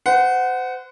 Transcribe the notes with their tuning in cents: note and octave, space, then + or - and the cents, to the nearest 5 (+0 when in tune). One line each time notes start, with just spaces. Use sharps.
C5 -35 F#5 +0